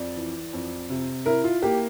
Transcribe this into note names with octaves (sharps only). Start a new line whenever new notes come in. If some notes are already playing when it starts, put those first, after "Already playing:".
Already playing: F2 D5
E3
F2
C3
E4 A#4
F4
A#3 G4